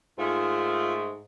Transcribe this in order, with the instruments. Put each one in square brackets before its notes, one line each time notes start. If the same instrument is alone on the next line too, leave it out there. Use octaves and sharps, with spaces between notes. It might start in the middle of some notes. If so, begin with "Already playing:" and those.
[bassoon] G#2 [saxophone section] D#3 G#3 A3 [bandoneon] F4